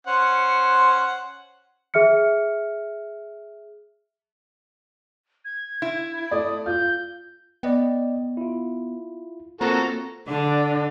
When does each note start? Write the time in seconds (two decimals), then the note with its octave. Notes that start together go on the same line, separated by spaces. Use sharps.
0.07 C#4 C5 F#5
1.94 G#4 E5 F6 C#7
5.45 G#6
5.82 E4
6.31 A3 D5 D#6
6.66 F4 G6
7.63 B3 D5 D#5 G5
8.37 E4 F4
9.61 A#3 C4 F4 F#4 A4 C5 A#5
10.27 D3 D4